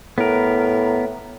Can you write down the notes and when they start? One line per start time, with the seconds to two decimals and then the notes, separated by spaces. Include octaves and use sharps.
0.18 A2 B3 A#4